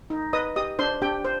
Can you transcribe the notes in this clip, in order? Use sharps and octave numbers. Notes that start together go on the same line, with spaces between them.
D#4
B4 D#5 D#6
G4 D#5 D#6
D4 C5 C6
D4 G4 G5
C5